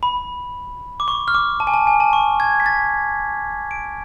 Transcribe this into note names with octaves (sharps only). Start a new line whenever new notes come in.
B5
D6
C#6
F6
D6
A5
G#5
A5
G#5
A5
C#6
G#6
B6
A6
D7